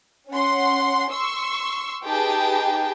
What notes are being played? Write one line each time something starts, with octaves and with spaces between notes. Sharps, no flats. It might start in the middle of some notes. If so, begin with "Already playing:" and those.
C#4 F#5 C6
C6 C#6 E6
D#4 G4 G#4 B4 G5 A5